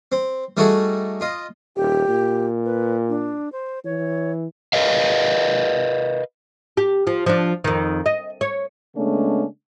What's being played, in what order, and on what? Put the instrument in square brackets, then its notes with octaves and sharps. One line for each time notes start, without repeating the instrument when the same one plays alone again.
[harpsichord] C4
G3 A3 D#4 F#4 G#4 A4
F4 D#5
[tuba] D#1 [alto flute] G4
[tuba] A#2
[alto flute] B4
D4
C5
[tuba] E3 [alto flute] C#5
[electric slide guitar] A#4 B4 D#5 F5
[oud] G4
F3
F3 D4
F2 D#3
D#5
C#5
[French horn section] C#3 G#3 A3 B3 C#4 D4